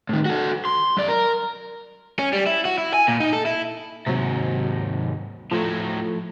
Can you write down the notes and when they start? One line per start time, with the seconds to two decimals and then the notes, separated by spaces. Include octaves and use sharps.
0.09 A2 D#3
0.25 F#4 A4
0.65 C6
0.97 F#2 D5
1.08 A#4
2.19 C#4
2.33 G3
2.46 E4
2.65 F#4
2.78 E4
2.94 G#5
3.08 A#2
3.20 D#4
3.33 A4
3.46 E4
4.06 D#2 G#2 C3 F#3
5.51 A2 F3 F#3 A3